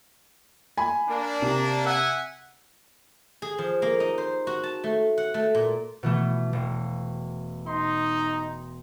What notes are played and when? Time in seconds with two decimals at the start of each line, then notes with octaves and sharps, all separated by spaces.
0.77 G#5 B5
1.09 A#3 D4
1.42 C3
1.86 E5 F#5 G#5
3.42 G#4
3.58 F3
3.82 A#3
4.00 D#4
4.18 C5
4.47 F#4
4.63 A5
4.84 A3
5.18 F#5
5.34 A3
5.55 A#2
6.03 B2 E3 A3
6.53 E1
7.66 D#4 C6